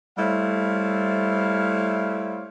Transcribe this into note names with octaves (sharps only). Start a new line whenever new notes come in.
G3 A3 E4 C5 C#5 F5